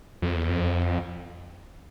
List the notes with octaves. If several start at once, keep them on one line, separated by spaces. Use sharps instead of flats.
F2
E2
F2